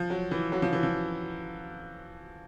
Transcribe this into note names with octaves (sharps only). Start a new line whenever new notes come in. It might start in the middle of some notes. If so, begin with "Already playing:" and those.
Already playing: F3
F#3
E3
F#3
F3
E3
F3